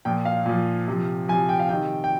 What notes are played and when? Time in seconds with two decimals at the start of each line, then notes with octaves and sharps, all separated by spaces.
0.05 A#2 F3 G5
0.25 F5
0.46 A#2 F3
0.88 C3 F3
1.28 F3 G#5
1.32 C3
1.49 G5
1.59 F5
1.69 C3 D#3 G5
2.04 G5